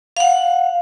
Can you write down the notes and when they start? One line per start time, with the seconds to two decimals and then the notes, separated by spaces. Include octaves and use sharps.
0.17 F5 F#5